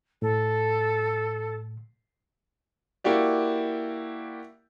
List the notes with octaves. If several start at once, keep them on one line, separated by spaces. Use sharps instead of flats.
A2 A4
A#3 E4 F#4 G4 D5